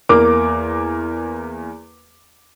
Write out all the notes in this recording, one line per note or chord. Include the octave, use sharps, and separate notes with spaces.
E2 A#3 A#4 D6